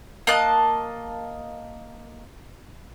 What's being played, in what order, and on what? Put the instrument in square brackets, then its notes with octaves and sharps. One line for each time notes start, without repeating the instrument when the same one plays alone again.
[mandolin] A#3 D#5 A5 F#6